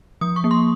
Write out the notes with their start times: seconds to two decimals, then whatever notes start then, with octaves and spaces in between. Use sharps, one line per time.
0.21 F3 D#6
0.36 C#6
0.44 A#3
0.51 C6